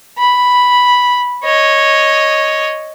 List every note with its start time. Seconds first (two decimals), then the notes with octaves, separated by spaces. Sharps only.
0.18 B5
1.43 C#5 D#5